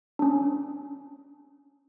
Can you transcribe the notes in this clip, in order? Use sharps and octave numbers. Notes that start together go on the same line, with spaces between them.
C#4 D4